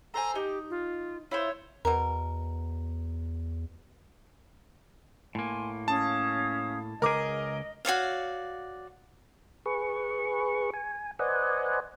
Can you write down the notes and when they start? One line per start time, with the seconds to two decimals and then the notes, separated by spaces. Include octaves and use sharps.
0.14 A4 C5 G#5 A#5
0.35 D#4 G4
0.70 F4
1.31 E4 F4 C5 C#5
1.85 E2 B2 A#4
5.35 A2 A#3 G#5 C6
5.88 C#4 F5 A5 D#6
7.02 C#2 G#4 A#4 D#5 D6
7.85 F#4 C#5 D5 F5
9.66 G#4 B4 C#6
10.74 G#5
11.19 B4 C5 D5 D#5 F#5 G#5